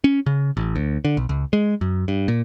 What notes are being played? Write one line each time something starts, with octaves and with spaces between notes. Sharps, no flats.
C#4
C#3
A1
D2
D3
B1
C#2
G#3
F#2
G2
A#2